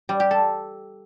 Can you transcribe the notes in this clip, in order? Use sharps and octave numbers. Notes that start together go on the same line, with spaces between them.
G3
G4
A4